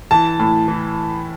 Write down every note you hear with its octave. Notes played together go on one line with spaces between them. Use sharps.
E3 A5
A2
E3